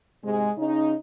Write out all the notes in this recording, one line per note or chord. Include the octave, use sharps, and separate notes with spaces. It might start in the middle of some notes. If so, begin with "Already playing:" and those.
G#2 C3 G#3
C#3 C#4 D#4